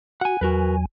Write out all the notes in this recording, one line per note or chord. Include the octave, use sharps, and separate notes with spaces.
F#4 F#5 G#5
E2 F#3 F#4 A#4 B4 G#5